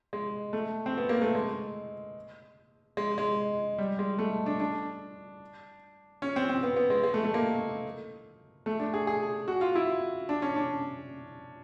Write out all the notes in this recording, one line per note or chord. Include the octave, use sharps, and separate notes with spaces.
G#3
A3
C4
B3
A#3
A3
G#3
G#3
G#3
G3
G#3
A3
D4
D4
C#4
C4
C4
B3
B3
G#3
G#3
A3
A3
A#3
A3
D4
G#4
G#4
F#4
F4
E4
D4
C#4
D4